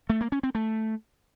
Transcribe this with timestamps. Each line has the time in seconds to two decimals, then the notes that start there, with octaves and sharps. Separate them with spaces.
0.10 A3
0.21 A#3
0.32 C#4
0.43 C4
0.55 A3